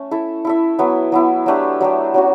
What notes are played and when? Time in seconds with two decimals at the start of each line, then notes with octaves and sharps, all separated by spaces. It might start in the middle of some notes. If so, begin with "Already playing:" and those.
Already playing: A3 C#4
0.11 E4 A4 E5
0.45 E4 A4 E5
0.78 F#3 B3 E4
1.12 F#3 B3 E4
1.46 F#3 A3 D4 G4
1.80 F#3 A3 D4 G4
2.14 F#3 C#4 F#4